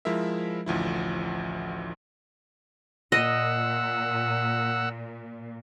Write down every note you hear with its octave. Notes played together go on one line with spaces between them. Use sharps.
F3 G#3 E4 A#4 E5
A1 D2 F3 E4
A#2 D#5 F#5 E6